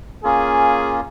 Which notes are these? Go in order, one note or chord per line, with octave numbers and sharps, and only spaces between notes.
A#3 C#4 F4 G#4